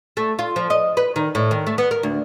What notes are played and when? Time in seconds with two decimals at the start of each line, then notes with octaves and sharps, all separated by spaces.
0.17 A3
0.39 F4
0.56 F3
0.70 D#5
0.97 B4
1.16 D#3
1.35 A2
1.51 D#3
1.67 A3
1.78 B3
1.91 A#4
2.03 D2